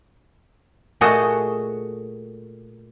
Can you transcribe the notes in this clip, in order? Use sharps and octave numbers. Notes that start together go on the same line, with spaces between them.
A#2 A3 F#4 G#4 A4 D#5